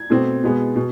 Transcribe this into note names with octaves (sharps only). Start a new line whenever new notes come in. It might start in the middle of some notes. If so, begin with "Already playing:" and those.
Already playing: G#6
B2 A3 C4
B2 G#3 B3
B2